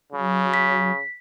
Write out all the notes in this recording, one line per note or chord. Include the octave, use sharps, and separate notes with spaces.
C#3 F#3
B6